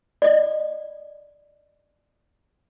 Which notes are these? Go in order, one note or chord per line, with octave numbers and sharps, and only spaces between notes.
D5 D#5